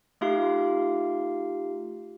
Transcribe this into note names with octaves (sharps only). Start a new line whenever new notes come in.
A3 D#4 F4 G4 F5